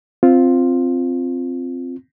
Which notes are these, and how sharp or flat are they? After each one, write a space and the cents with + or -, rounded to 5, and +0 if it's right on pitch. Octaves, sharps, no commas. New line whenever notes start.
C4 +0 F4 +0